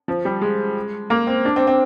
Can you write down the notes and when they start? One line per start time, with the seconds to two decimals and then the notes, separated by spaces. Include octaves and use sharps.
0.08 F3
0.25 G3
0.41 G#3
1.10 A#3
1.27 C4
1.45 D4
1.56 C4
1.67 C4